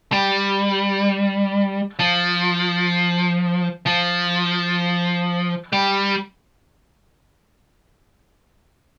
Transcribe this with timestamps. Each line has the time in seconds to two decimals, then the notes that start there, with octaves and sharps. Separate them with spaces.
0.12 G3
1.99 F3
3.86 F3
5.73 G3